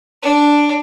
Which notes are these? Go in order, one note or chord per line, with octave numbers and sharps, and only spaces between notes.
D4